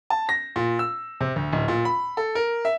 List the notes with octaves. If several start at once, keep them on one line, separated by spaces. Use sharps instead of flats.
A5
A#6
A#2
E6
C3
D2
D1
A#2
B5
A4
A#4
E5